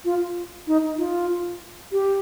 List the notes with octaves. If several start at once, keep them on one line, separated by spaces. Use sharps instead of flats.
F4
D#4
F4
G4